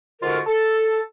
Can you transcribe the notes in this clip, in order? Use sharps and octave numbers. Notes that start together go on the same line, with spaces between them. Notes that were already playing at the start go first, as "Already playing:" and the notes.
G#2 D3 F4 F#4 A#4
A4